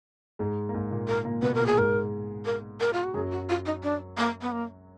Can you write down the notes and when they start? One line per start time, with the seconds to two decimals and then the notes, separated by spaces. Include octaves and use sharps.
0.39 G#2 G#3
0.69 A#3
0.74 G#2 G#3
0.91 A#2 A#3
1.08 A#4
1.25 A#2 A#3
1.42 B2 B3 B4
1.55 A#4
1.60 A#2 A#3
1.66 G#4
1.77 G#2 G#3 A#4
2.45 A#4
2.80 A#4
2.93 F4
3.04 F#4
3.14 F#2 F#3 G#4
3.32 F#4
3.49 F4
3.66 D#4
3.83 D4
4.18 A#3
4.41 B3
4.52 A#3